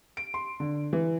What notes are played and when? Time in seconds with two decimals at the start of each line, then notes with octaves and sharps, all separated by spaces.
0.17 D7
0.34 C6
0.60 D3
0.93 E3